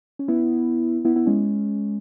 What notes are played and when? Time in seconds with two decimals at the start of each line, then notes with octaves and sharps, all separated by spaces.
0.19 C#4
0.28 B3 E4
1.05 B3 E4
1.16 B3 E4
1.26 G#3 C#4